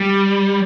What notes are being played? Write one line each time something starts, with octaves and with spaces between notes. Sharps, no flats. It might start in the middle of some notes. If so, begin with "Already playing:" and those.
Already playing: G3